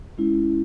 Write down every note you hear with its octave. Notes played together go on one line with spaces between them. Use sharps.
G#3 C#4 E4